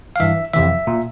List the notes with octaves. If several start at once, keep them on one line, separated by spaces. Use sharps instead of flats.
F5
G2 E3 E5
F2 C3 E3 E5
A#2